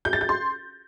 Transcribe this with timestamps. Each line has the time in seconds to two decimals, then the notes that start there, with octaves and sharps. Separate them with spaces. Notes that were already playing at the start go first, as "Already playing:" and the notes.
0.05 G6
0.13 A6
0.21 G6
0.29 C6